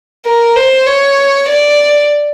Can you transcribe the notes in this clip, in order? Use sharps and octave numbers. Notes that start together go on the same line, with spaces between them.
A#4
C5
C#5
D5